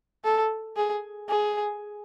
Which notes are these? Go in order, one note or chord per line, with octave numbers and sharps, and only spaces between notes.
A4
G#4
G#4